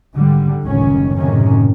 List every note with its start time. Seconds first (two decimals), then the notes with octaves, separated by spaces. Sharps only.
0.14 G#1 D3 G3
0.62 F#1 C#2 A2 D#3 C#4
1.17 F#1 F#2 A2 C3 D#3 C#4